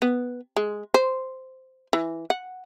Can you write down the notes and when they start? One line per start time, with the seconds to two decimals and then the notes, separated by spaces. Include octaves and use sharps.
0.02 B3
0.56 G#3
0.94 C5
1.93 E3
2.30 F#5